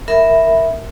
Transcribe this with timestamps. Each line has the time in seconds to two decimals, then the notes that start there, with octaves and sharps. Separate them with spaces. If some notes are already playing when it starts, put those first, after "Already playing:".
0.08 A#4 E5 B5